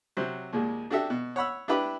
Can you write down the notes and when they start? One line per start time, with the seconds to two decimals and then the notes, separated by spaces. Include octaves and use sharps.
0.17 C3 F#3 C5
0.53 D#2 A#2 G#3
0.90 D4 F#4 G4 A4 E5
1.10 B2
1.36 C#5 F#5 B5 E6
1.68 D4 E4 G4 B4 B5 D6